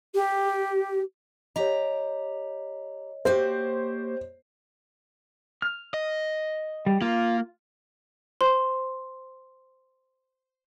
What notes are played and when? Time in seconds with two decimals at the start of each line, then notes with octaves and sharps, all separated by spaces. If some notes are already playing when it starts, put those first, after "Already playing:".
0.15 G4
1.56 G4 C#5 D#5 A#5
3.25 A#3 F#4 G4 C5
5.62 F6
5.94 D#5
6.86 G3
7.02 A#3 F4
8.41 C5 C6